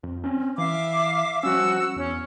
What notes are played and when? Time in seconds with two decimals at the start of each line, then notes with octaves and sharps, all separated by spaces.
0.03 F2
0.24 C4 C#4
0.58 E3 E5 F5 D6
1.43 F3 G3 C#4 F#4 E6
1.96 E2 C#4